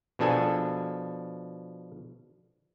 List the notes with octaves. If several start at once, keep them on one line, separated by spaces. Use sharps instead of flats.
B2 F3 D4 A4 G#5